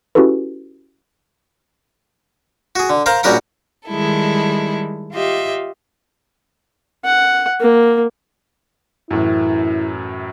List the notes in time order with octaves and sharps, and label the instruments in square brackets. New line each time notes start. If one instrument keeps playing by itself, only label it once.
[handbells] C#4 E4 F#4 G4 A4 B4
[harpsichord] F#4 G#4
D3
A#4 C5 F5 A#5
A#1 G3 C#4 F#4 A#4 F#5
[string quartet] D#3 G3 G#3 E4 A4
F4 G4 D#5 E5
[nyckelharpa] F#5
A#3
[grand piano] F#2 A2 E3 [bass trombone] E4